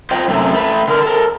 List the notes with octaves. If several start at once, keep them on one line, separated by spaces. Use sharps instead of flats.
F4 C5 D#5 G5
F#2 C3 A3
A3 B4
D3 A#4
A4 A#4